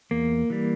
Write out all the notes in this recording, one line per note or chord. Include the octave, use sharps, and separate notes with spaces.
E2 A#3
E3 G3